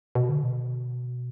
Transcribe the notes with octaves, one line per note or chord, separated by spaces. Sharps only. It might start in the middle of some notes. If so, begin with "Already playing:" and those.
B2
D3
B2